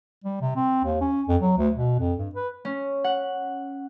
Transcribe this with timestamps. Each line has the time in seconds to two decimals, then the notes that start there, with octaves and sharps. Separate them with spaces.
0.24 G3
0.41 C3
0.56 C4
0.84 D#2
1.01 C#4
1.28 F2
1.42 F#3
1.58 D2
1.76 B2
1.99 F2
2.19 G2
2.35 B4
2.65 C#4
3.04 F#5